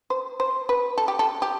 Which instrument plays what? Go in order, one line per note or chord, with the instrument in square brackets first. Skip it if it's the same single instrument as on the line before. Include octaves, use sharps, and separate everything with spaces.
[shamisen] C5
C5
B4
A4
G4
A4
G4